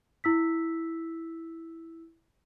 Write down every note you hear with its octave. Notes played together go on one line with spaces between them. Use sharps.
E4 E6 B6